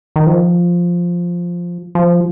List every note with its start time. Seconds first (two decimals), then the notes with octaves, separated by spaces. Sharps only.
0.16 D#3
0.27 F3
1.95 F3